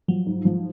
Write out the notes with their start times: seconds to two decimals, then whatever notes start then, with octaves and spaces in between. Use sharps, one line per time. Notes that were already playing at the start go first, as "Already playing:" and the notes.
0.08 F3 F#3
0.26 G#2
0.45 F3